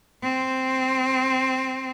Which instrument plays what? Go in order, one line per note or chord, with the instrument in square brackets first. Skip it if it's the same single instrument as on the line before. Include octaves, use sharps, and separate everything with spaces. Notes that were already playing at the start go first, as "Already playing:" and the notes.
[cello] C4